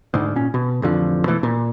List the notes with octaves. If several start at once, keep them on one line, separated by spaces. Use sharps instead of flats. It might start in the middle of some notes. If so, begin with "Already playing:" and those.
D2 G#2
A#2 C#4
B2
A1 F2 D3 F3
B2 E3 A3
A#2